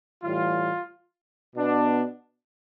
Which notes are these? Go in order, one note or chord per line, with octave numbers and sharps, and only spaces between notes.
A2 E3 G3 F4
B2 B3 D4